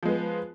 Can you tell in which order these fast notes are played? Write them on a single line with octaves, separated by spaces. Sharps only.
F3 G#3 B3